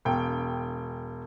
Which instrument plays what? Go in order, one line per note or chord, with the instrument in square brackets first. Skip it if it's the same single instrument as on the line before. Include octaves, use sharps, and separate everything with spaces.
[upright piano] E1 G5